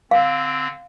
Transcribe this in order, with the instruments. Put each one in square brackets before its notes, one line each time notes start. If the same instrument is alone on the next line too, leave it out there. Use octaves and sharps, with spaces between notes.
[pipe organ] D3 C4 [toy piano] F5